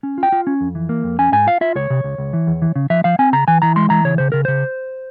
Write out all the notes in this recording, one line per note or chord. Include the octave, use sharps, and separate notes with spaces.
C#4
F4
G5
F4
C#4
F2
E3
A#3
F2
C#4 G#5
G#2 G#5
F4 F5
F4 E5
C#2 C#5
C3
C#2
C#2
E3
E2
E3
C#3
F3 E5
F3 F5
C4 G#5
C#3 A#5
E3 G#5
E3 A#5
G#3 C6
E3 A#5
C#3 C#5
C#3 C5
C#3 A#4
C#3 C5